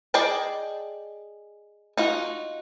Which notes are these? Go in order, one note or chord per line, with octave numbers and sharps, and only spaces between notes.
G#4 D5 D#5 G5 A5
D#4 F4 F#4